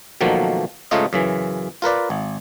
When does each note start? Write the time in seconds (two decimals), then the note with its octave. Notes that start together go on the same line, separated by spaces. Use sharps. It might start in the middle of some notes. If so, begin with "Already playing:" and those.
0.21 B2 D#3 F3 F#3 A3 A#3
0.91 G#2 C#3 A3 D#4 F4 D#5
1.13 F#2 C#3 E3
1.82 F4 A#4 B4 D5
2.10 G#1